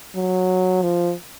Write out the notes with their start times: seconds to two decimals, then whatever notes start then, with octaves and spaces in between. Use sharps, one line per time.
0.15 F#3
0.82 F3